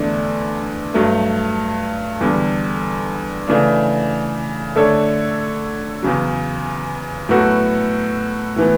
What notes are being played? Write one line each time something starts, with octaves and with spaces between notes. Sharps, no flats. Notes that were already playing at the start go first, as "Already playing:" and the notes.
Already playing: E2 D3 A3 D4
G2 F#3 A3
E2 D3 G3
C#3 E3 A3 D4
D3 A3 D4 A4 C#5
E2 C#3 F#3
A2 F#3 B3 F#4 A4
A2 E3 B3